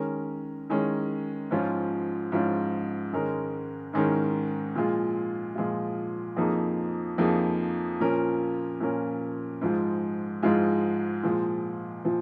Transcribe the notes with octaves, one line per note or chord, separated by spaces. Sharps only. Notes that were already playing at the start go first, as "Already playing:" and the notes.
Already playing: D#3 G#3 C#4 A#4
D#3 G#3 C#4 A#4
G#2 F3 C#4 F4
G#2 F3 C#4 F4
G#2 D#3 G#3 C#4 A#4
G#2 D#3 G#3 C#4 A#4
A#2 F3 G#3 F4
A#2 F3 G#3 F4
F2 F3 A#3 D#4 G#4
F2 F3 A#3 D#4 G#4
A#2 F3 C#4 A#4
A#2 F3 C#4 A#4
G#2 F3 G#3 F4
G#2 F3 G#3 F4
A#2 F3 G#3
A#2 F3